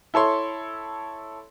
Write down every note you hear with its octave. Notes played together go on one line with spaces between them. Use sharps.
E4 A4 C#5 C6